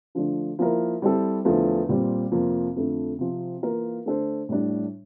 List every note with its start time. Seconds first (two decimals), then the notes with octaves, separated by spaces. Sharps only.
0.15 D3 F3 A3 D4
0.59 F3 A#3 E4 A#4
1.02 G3 C4 E4 A4 C5
1.45 E2 D3 F3 A3 E4
1.89 A#2 G3 C4
2.31 F2 C3 F3 A#3
2.76 F2 D3 A3
3.19 C3 F3 C4
3.62 E3 A#3 F4 A#4
4.05 D3 A3 D4 A4 C5
4.49 A2 G3 D4